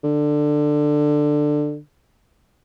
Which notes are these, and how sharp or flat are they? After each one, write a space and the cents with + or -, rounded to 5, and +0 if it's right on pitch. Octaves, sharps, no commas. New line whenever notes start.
D3 +15